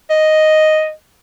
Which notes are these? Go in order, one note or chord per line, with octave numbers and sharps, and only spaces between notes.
D#5